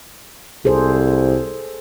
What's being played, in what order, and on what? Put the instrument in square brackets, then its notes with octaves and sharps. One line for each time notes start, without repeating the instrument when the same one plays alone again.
[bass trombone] C2 [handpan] G#4 A4 C5